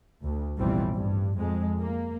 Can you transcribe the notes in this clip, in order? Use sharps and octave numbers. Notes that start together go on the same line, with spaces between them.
D2
A1 F2 B2 E3 G3 C4
G2
F2 G#3
A#3